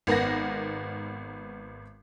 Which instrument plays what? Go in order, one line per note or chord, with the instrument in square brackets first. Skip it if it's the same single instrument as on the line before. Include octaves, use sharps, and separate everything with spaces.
[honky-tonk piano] G#1 B3 A#4 F#5 A#6